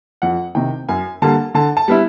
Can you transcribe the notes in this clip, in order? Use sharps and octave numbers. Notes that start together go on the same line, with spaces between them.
F2 F#5
C3 D#3 G5
F#2 G#5
D3 G3 A#3 A5
D3 A5
A5
G3 B3 E4